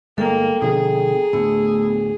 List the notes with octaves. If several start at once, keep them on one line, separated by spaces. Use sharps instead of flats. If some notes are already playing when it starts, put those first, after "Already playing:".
G1 G#3 A#3 A4 G5 A#5
B2 D3 F3 G#4
D2 A2 A3 B3 E6